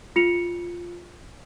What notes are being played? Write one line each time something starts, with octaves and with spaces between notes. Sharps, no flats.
F4 C#7 F7